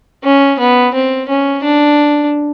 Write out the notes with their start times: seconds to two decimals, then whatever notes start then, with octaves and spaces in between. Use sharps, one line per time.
0.24 C#4
0.59 B3
0.94 C4
1.29 C#4
1.63 D4